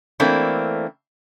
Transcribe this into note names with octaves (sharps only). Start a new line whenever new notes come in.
E3 A3 A#3 C4 D4